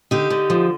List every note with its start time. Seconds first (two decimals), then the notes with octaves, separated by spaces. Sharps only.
0.11 D3 D#4 G4
0.30 D3
0.50 F3